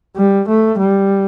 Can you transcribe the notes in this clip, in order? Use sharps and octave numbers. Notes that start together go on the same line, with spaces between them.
G3
A3
G3